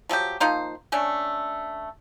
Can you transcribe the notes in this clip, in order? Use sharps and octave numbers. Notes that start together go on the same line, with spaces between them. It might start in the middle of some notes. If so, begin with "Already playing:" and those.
F3 F#3 D4 G4
F3 A#3 D#4 C5
A3 C#4 D4